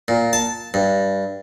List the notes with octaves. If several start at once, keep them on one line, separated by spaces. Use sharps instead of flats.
A#2
A5
G2